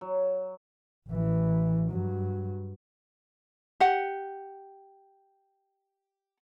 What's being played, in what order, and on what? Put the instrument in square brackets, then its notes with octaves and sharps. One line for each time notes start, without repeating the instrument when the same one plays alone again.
[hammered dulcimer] F#3
[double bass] A1 E3
G2 F#3
[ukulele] G4 F#5